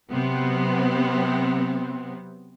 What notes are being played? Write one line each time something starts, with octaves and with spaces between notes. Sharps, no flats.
C3 F#3 B3 C4